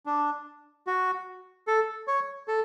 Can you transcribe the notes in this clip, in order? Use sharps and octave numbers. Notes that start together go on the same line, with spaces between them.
D4
F#4
A4
C#5
A4